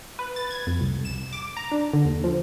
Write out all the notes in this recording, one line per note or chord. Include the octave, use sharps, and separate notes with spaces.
B4
A6
G#6
F2
C2
E7
D6
A#5
D4
D3
D#2
F3